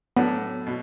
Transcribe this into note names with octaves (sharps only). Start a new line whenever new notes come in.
A2 F#3 A3 B3 D4
B2